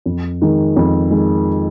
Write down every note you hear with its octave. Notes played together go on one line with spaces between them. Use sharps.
F2
D#3 G#3
F2
D#3 G#3